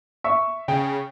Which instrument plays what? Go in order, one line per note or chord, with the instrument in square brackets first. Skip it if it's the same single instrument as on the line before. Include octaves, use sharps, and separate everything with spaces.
[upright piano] E5 C#6
[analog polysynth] C#3 [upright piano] G5